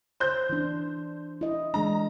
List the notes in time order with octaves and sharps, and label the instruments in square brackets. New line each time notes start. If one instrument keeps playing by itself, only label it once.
[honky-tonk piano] C5 G6
[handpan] E3 D4
E4 D#5
[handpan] E3 G#3 D4 [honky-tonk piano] A#5